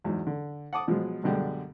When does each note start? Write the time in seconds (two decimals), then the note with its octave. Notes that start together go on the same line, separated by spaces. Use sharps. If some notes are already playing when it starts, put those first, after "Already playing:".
0.04 E2 G#2 F#3
0.27 D3
0.73 F#5 A5 D6 D#6
0.88 B2 F3 F#3 G#3
1.23 F#2 B2 D3 G3 G#3